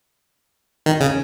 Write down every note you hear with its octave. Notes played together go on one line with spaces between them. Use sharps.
D#3
C#3